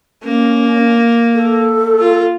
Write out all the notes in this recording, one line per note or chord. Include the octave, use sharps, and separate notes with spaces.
A#3 C#4
A4
F4